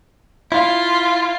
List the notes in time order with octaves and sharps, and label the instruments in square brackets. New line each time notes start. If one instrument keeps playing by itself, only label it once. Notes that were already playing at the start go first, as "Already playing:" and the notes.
[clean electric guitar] E4 F5 [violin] F4